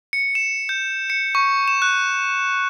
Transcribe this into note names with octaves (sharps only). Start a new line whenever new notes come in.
C#7
E7
G6
C#7
C#6
E7
F#6